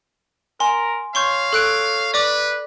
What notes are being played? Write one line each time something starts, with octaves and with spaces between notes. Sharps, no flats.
A#4 G#5 C6
C#5 F5 C6 C#6 G6
A4 C#5 F#6 D7
B4 D5 D6